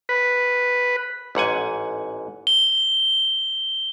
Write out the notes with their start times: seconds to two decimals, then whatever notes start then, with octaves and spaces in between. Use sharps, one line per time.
0.09 B4
1.35 A1 G#2 F#5 G#5
2.47 G7